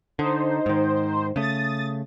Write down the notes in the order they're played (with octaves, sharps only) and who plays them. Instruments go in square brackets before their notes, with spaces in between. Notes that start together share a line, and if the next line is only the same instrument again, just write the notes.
[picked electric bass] D3 [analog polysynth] D#4 C5
[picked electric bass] G#2 D#3
[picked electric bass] C#3 A3 [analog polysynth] D#6 A6